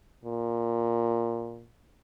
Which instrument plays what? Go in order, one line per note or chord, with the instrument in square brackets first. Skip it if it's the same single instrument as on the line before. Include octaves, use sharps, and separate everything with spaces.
[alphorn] A#2